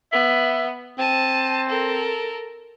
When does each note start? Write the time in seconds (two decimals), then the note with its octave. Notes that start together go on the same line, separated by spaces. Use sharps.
0.12 B3 E5
0.98 C4 A5 D#7
1.69 A4 A#4